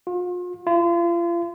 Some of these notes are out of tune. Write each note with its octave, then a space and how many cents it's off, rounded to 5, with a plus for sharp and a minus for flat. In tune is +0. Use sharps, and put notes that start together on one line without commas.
F4 +40
F4 -35